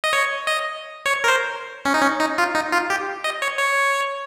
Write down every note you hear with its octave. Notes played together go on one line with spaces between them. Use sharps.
D#5
C#5
D#5
C#5
A#4
C5
C#4
D#4
C#4
D#4
F4
D#4
F4
G4
D#5
C#5
C#5